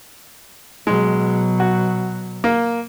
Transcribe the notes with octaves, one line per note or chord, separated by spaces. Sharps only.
B2 F#3 G#3
F#4
A#3